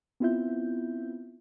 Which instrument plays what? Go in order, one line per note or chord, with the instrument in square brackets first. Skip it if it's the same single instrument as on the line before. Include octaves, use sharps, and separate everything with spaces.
[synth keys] B3 C4 E4 F4 E5 G6